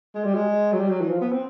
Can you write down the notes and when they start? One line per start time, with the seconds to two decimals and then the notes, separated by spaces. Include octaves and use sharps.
0.15 G#3
0.24 G3
0.35 G#3
0.73 F#3
0.80 G3
0.90 F#3
1.01 E3
1.11 F3
1.22 B3
1.32 C4